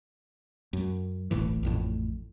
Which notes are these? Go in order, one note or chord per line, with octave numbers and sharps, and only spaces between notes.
F#2
D1 A1 A2 E3
A1 F2 A2